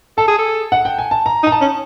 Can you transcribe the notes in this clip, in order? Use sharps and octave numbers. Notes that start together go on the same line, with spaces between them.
A4 A5
G#4
A4
F#5
G5
G#5
A5
A#5
D#4
A#5
A5
C#4